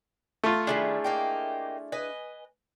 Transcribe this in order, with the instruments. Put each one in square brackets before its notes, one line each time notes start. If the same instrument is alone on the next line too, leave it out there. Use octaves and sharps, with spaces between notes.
[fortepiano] A3 F4
[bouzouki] D3 D#3 G3 [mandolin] D4 E4 G#4
[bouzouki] A#3 D#4 G4
B4 D#5 G#5